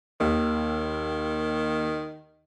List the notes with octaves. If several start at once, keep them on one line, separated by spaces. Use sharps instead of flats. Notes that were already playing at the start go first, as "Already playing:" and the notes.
D#2 D#3